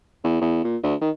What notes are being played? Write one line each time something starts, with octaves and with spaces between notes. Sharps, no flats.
E2
E2
A#2
D2
D#3